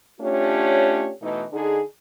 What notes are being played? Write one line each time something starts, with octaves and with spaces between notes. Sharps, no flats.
A3 C#4 D4 F4 G4 C#5
B2 E3 A3 D#4
D3 D#4 G#4